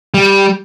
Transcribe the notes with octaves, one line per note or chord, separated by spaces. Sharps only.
G3